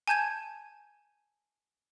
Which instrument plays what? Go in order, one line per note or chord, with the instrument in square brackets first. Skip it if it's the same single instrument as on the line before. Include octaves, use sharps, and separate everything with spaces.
[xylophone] G#5 A5 G6 G#6 D#7